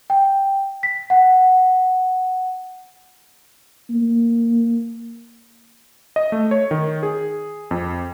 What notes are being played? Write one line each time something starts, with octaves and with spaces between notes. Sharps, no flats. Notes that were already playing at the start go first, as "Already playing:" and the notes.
G5
B6
F#5
A#3
D#5
A3
C#5
D#3
G#4
F2